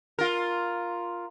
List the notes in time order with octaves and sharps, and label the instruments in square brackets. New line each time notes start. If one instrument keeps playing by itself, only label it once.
[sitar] F4 A#4